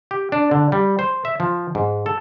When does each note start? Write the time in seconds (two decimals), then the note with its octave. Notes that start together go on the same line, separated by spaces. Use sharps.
0.11 G4
0.32 D4
0.51 D3
0.72 G3
0.99 C5
1.25 E5
1.40 F3
1.75 G#2
2.06 A4